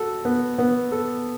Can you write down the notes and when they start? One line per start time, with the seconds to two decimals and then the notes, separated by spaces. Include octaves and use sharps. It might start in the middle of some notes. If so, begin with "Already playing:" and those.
Already playing: F#4 A4
0.25 B3
0.59 B3
0.92 A4